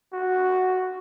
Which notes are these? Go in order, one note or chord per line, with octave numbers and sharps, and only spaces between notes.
F#4